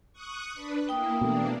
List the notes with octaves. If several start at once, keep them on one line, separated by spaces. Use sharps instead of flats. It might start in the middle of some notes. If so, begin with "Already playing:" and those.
C#6 D#6 F#6
D4 B4
A#3 E4 G5 D#6
B2 E3 A3 A#3 D4